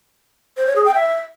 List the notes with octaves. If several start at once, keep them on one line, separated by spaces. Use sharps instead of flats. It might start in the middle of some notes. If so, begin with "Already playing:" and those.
C5
C#5
G#4
G5
E5